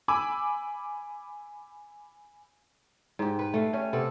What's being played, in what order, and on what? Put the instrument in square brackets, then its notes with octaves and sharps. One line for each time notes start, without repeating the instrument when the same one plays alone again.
[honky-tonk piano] G#5 B5 D6 E6
[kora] G#2 G4
B4
A3 F5
C#4 G4
C3 B3 A4